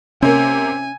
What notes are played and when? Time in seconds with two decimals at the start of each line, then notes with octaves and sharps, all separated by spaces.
0.22 C3 A#3 C#4 G#5